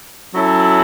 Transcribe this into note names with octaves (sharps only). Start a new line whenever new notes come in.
F#3 C#4 E4 A4